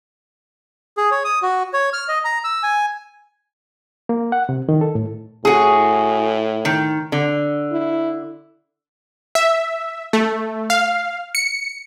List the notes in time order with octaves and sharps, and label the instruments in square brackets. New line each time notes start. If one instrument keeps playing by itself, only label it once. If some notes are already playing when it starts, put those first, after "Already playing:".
[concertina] G#4
C#5
D#6
F#4
C#5
F6
D#5
A#5
E6
G#5
[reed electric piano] A#3
F#5
C3
D#3
A4
A2
[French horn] A2 [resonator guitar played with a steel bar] F#4 G#4
[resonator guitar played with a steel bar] D#3
D3
[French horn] E4
[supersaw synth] E5
A3
F5
C#7